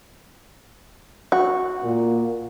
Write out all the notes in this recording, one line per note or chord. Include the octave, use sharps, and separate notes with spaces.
F#4
A#2 A#3